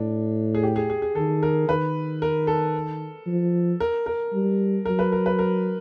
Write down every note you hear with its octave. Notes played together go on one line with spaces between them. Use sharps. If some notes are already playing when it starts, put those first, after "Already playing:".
Already playing: A2 D4
G#4
G4
G#4
G#4
G#4
D#3 A4
A#4
D#3 B4
A#4
A4
F3
A#4
A#4
G3
F#3 A#4
B4
A#4
B4
A#4